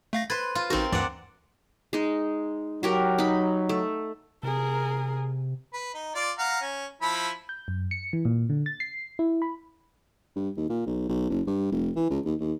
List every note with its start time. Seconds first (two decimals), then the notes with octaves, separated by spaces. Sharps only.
0.13 A3 F5 A#6
0.30 B4 C5 G#6 A6
0.55 F4
0.70 A1 C4 D#4 F#4 A#4
0.92 D2 G2 E3 D5 F#5
1.93 G#3 D#4
2.83 F#3 F#4 G4 A#4
3.18 D#4 B5
3.69 A3
4.43 C3 G#4 A#4
5.73 B4
5.94 D#4
6.15 F4 D5
6.38 F5 F#5 A#5
6.61 C#4
7.02 F3 E4 B5
7.49 G6
7.68 F#2
7.91 C#7
8.13 E3
8.25 A#2
8.50 D3
8.66 A6
8.80 C7
9.19 E4
9.42 B5
10.36 G2
10.57 D#2
10.69 A#2
10.86 B1
11.09 B1
11.30 F#1
11.47 G2
11.72 F1
11.96 E3
12.10 C#2
12.25 D#2
12.40 D#2